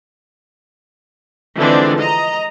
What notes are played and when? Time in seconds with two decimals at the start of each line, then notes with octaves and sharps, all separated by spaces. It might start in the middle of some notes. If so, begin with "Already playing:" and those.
1.58 D3 E3 F3 G#3 C4 D4
1.98 D#5 A#5